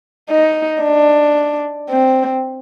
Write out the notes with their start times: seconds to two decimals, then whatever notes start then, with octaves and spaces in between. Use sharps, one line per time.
0.30 D#4
0.83 D4
1.90 C4